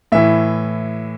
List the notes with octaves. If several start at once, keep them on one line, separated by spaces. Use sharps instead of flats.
A2 E3 E5